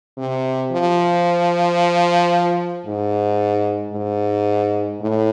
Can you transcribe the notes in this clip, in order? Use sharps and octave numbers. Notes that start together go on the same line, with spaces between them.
C3
F3
G#2
G#2
A2